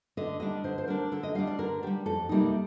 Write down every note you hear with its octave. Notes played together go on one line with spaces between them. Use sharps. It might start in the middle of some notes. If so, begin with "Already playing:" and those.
D3 D#5
G3 D4 D#5
D3 C5
C5
G3 D4 A#4
D3 A4
D#5
G3 D4 F5
D5
D3 A#4
G3 D4 G4
F2 A4
C3 G3 A#3 D#4